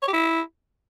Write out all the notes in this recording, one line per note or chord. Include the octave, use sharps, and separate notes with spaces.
C#5
G4
E4